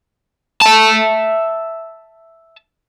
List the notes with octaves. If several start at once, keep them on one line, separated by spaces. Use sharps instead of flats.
E5 A5